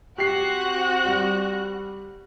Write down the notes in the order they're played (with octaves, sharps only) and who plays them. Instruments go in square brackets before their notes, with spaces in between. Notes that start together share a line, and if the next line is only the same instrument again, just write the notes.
[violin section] C4 F#4 F#6 [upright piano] G4 C7
[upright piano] G3